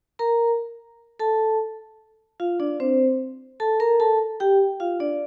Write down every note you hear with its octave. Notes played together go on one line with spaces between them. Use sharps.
A#4 A#5
A4 A5
F4 F5
D4 D5
C4 C5
A4 A5
A#4 A#5
A4 A5
G4 G5
F4 F5
D4 D5